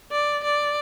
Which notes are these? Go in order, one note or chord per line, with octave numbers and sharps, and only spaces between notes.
D5
D5